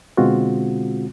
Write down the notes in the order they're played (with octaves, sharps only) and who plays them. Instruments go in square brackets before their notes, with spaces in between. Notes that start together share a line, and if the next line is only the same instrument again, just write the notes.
[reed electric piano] B2 D3 G#3 C4 F4 F#4